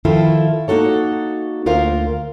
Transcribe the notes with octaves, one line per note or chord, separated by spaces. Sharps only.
D#3 F3 E4 F4 A4
A#3 D#4 F#4 A4 C#5
D2 F4 A#4 C5 F5